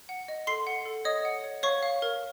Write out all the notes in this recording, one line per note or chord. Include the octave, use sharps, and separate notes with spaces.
F#5
D#5
A4 C6 C7
F#5
A4
C#5 D#5 D#6
F#5
C#5
C#5 F5 C#6
F5
A#4